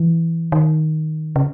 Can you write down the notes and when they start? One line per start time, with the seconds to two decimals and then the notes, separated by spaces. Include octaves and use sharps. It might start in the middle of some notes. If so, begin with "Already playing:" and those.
Already playing: E3
0.52 D#3
1.36 C#3